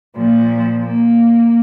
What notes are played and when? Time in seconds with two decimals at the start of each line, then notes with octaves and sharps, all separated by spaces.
0.17 A#2 F3
0.85 A#3